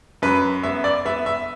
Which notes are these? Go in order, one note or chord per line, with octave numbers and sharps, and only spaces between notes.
F#2 B4
B3 E5
D5
B3 E5
E5